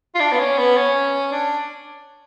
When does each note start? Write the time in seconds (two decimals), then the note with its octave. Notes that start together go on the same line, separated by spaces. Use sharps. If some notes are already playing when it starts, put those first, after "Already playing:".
0.15 F4
0.20 D4
0.32 B3
0.39 C#4
0.58 B3
0.77 C#4
1.32 D4